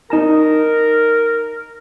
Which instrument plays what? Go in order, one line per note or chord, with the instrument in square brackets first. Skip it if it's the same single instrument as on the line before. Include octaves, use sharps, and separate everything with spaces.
[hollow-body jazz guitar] D#4 A5 A#5 [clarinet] A#4